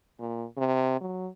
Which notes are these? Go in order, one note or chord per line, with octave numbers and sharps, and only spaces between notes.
A#2
C3
F#3